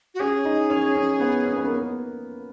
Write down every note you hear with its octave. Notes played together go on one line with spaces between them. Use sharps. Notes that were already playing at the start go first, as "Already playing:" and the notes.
F#4
C#4 G#4
D#4
C#4
C#4
B3
C#4
B3
A#3
B3